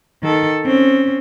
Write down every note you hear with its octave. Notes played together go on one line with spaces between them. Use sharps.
D#3 A4
C4 C#4